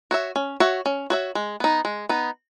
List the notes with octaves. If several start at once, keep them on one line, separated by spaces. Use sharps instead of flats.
F#4 C#5 E5
C#4
F#4 C#5 E5
C#4
F#4 C#5 E5
G#3
B3 D#4
G#3
B3 D#4